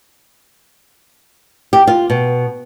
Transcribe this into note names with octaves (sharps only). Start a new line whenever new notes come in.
G4
F4
B2